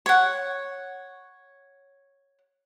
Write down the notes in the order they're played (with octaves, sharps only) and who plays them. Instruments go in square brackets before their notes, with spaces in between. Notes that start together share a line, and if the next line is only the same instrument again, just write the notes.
[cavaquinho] C#5 F#5